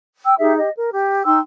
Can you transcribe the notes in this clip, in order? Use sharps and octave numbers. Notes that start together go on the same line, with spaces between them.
G5 E6
D#4 G4 G#4 E5
G4 D#5
A#4
G4
D#4 G5 C6 E6